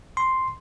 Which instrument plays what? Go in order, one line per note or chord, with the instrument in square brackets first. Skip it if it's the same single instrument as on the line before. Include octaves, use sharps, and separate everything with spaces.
[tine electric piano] C6